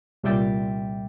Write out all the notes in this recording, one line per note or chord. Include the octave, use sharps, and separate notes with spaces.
C2 A#2 G3 E5 G5 A6